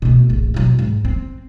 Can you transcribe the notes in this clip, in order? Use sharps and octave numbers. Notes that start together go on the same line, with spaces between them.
B2 A3
D1 A1
B2 F#3
G#2
C4